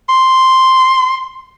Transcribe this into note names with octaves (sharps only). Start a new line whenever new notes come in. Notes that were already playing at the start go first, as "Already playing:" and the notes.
C6